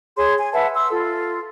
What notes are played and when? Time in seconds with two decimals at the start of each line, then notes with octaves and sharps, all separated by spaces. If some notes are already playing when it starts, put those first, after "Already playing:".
0.17 G#4 C#5 C6
0.39 G#5
0.53 B4 E5 F#5 A5
0.75 C6 E6
0.90 F4 A4